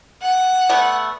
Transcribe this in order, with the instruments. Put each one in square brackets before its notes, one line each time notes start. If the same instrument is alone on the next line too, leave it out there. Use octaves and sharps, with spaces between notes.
[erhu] F#5
[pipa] A3 B3 D5